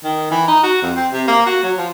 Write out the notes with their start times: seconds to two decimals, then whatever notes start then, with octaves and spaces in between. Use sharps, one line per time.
0.04 D#3
0.31 E3
0.48 D#4
0.63 F#4
0.82 F2
0.96 C4
1.12 C3
1.27 A#3
1.46 F#4
1.63 F#3
1.78 F3